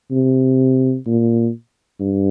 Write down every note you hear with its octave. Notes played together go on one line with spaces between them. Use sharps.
C3
A#2
G2